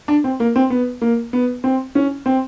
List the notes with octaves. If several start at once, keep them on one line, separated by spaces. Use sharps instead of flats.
D4
C4
A#3
C4
B3
A#3
B3
C4
C#4
C4